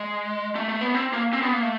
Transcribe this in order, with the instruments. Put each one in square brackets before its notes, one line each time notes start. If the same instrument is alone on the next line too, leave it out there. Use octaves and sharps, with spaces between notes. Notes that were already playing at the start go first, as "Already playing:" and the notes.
Already playing: [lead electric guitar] G#3
A3
A3
B3
C4
A#3
C4
B3
A#3
A3